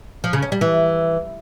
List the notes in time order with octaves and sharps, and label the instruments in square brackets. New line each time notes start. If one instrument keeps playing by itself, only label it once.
[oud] F3
C#3
C#4
G3
E3